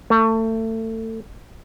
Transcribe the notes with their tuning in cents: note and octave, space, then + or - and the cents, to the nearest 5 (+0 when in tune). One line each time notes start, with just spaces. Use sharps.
A3 +25